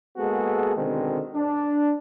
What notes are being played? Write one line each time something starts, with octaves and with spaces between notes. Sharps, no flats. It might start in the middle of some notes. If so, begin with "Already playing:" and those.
G#3 A#3 B3 F#4 G#4 A4
B2 D3 D#3 G#3 C4
D4